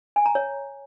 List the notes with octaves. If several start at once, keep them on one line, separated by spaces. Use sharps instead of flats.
G#5
A#5
C#5